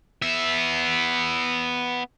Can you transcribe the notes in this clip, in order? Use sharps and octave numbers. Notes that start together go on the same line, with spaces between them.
B3 E5